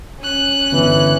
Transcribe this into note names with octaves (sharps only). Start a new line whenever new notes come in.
C#4 F#6
G1 E3